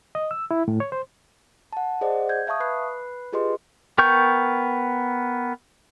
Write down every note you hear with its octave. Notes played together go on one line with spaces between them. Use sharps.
D#5
E6
E4
A2
C#5
C5
F#5 A5
G#4 C5 D5 D#5 F#5
G6 G#6
E5 F5 A5 C#6 D#6
B4 B5 F#6 C7
F4 G4 G#4 B4 D#5 C6
B3 A#4 G5 C#6 G6